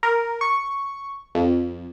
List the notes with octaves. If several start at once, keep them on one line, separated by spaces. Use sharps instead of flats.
A#4
C#6
F2